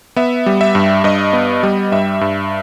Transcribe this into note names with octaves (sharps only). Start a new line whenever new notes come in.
B3 E5
G3
E5
G2
G2 D#5
B3
G3
G2 E5
G2